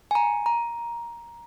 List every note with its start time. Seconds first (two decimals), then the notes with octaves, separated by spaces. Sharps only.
0.11 G#5
0.15 A#5
0.46 A#5